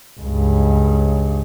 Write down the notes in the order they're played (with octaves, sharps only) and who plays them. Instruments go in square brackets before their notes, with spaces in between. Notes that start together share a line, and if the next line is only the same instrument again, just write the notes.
[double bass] C#2 G2